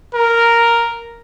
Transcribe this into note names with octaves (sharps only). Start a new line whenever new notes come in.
A#4